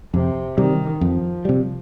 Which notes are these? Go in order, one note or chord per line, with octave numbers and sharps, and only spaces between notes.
F2 C3
C3 D#3 G3
F2 F3
C3 G3